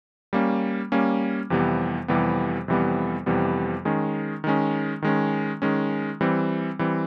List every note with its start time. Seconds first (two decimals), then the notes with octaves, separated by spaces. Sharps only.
0.33 G3 A#3 C#4
0.92 G3 A#3 C#4
1.50 F2 C3 E3 G3 B3
2.08 F2 C3 E3 G3 B3
2.68 F2 C3 E3 G3 B3
3.26 F2 C3 E3 G3 B3
3.85 D#3 G#3 C#4
4.44 D#3 G#3 C#4
5.02 D#3 G#3 C#4
5.62 D#3 G#3 C#4
6.21 E3 G3 C4
6.79 E3 G3 C4